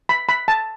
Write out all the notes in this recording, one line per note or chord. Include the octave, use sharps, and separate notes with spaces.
B5
B5
A5